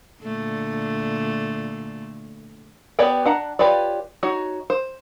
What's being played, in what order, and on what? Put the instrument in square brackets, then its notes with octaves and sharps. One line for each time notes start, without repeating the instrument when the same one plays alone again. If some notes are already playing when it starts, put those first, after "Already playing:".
[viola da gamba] A#2 D3 A3
[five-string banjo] B3 G4 C#5 D5 G5
D4 F#5 A#5
F4 G4 B4 C#5 D5
D#4 F#4 C#5
C5